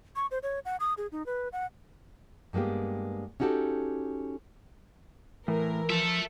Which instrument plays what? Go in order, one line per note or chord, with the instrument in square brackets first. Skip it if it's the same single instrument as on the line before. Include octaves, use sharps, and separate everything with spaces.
[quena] C#6
C5
C#5
F#5
D#6
G#4
D#4
B4
F#5
[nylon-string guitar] G2 G#3 A#3 B3 G4
C#4 D#4 F#4 G4 A4
[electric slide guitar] A2 [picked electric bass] E3 [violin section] A#4
[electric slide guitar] F3 [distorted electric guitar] A4 E5